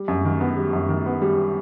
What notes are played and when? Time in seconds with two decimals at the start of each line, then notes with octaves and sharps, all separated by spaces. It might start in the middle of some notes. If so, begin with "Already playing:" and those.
Already playing: G3
0.08 F#2
0.25 D#3
0.41 B3
0.57 G3
0.73 F#2
0.89 D#3
1.06 B3
1.22 G3